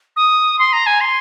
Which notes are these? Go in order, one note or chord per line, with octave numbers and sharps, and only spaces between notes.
D#6
C6
A#5
G#5
C6